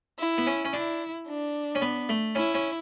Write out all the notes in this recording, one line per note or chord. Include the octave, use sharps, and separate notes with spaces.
E4
B3
C#4
C#4
D4 E4
D4
C#4
B3
A3
C#4 E4
C#4